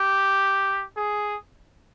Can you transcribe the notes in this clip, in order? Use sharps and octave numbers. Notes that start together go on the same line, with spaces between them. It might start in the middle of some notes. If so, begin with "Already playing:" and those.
Already playing: G4
G#4